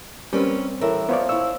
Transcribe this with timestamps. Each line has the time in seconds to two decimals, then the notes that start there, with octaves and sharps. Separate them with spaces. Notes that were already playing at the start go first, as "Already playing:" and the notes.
0.33 G3 C4 C#4 A#4 B4
0.81 A2 E3 A#4 E5
1.09 F3 B3 C#5 D5
1.29 E4 C#5 E6